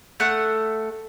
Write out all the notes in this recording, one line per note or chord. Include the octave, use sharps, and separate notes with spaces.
A3 F#5